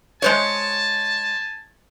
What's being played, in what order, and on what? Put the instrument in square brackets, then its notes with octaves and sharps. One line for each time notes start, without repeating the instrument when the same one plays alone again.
[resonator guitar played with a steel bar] G#3 C5 C#5 [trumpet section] G#5 A5